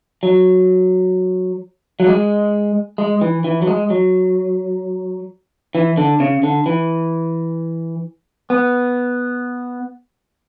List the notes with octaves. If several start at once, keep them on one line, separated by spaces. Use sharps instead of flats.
F#3
F#3
G#3
G#3
E3
E3
F#3
G#3
F#3
E3
D3
C#3
D3
E3
B3